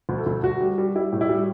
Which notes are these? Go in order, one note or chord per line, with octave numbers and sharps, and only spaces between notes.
D2
A4
D2
D2 F#4
G3
G3
G3 E4
A2
E4
G3